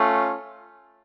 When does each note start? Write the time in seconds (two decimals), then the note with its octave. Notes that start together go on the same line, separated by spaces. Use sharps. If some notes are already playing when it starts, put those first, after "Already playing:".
Already playing: A3 C#4 F4